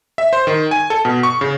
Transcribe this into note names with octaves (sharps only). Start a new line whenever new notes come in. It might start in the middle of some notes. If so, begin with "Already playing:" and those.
E5
C5
D#3
G#5
A4
B2
C#6
C#3